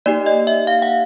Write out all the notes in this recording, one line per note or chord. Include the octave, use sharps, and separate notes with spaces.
A#3 D#4 G4 D5
D#5
E5
F5
F#5